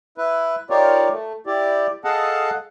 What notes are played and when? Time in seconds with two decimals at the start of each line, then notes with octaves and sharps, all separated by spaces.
0.18 E4 B4
0.70 D#4 F4 G4 A#4 C#5 D5
1.11 A3
1.46 E4 G4 D5
2.04 G#4 A4 D#5 F5 F#5 A5